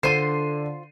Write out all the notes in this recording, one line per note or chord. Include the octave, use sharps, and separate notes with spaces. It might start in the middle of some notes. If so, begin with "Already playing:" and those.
D3 F4 C5 C7 D#7